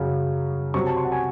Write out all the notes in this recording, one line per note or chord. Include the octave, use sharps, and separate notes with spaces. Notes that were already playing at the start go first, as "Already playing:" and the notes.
Already playing: F#2 C#3 F#3
C3 F#3 C#6
A5
C6
F#5
G#5